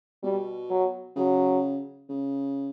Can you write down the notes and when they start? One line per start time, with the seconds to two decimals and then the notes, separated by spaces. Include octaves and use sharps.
0.23 B2 G3
0.70 F#3
1.16 C#3 F#3
2.09 C#3